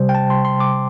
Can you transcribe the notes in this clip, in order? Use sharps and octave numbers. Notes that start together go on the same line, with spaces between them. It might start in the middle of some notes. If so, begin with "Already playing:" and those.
Already playing: C3 G3 C5
G5
A5
C6
C6
D6